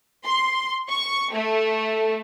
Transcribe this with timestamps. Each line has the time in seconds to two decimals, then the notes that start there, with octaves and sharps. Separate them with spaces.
0.25 C6
0.90 C#6
1.33 A3